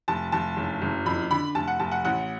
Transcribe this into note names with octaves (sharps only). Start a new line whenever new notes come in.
F1 A5
F1 A5
F#1
F#1
F2 B5
D3 B5
F1 A5
F#5
F1 A5
F#5
A1 F#5